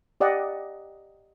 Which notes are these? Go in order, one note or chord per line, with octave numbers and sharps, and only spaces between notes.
G4 D5 D#5 F#5